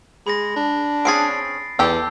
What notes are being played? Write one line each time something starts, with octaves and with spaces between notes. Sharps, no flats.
G#3 B5 A#6
D4
C4 C#4 G#4 A6 C7 D7
E2 G4 A4 G5 E6 G6